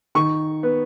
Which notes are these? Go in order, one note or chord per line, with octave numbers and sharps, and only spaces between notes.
D#3 C#6
B3